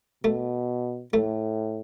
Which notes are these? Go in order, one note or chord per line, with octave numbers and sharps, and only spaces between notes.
B2 A3
A2 A3